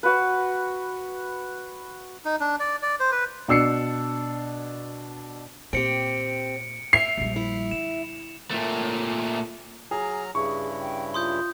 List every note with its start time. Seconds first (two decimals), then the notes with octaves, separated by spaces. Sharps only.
0.03 F#4 B4
2.25 D#4
2.41 D4
2.60 D5
2.82 D5
3.00 C5
3.12 B4
3.48 B2 D4 E6 C7 C#7
5.73 A#2 C4 G4 C#7 D7
6.93 E5 C7 F7
7.18 A#1 G3
7.36 E4
7.71 D3 E7
8.52 A#2 A3
9.91 F#3 G#4 A#5 F6
10.35 G2 C#3 E4 G#4 C#6
10.80 G5
11.14 F4 C6 D#6 G6